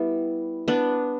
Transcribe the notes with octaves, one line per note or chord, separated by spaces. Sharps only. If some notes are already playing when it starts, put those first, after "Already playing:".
Already playing: G3 B3 E4
B3 D4 B4